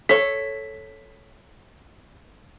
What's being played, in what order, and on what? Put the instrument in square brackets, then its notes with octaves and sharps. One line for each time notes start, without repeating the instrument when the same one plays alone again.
[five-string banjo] A4 C#5 [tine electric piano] B6